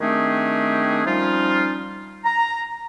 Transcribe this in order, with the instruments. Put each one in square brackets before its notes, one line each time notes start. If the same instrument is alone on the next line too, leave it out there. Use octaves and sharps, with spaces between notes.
[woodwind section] D#3 A3 C4 D4 G4 G#4
F3 G3 C#4 D#4 F4
A#5